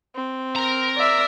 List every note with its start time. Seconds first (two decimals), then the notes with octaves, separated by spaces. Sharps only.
0.15 C4
0.56 A#4 A#5
0.96 D5 E5